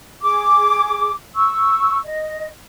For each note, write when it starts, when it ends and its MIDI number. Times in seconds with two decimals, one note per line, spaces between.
0.23 1.12 68
0.23 1.12 86
1.35 2.00 85
1.35 2.00 88
2.04 2.49 75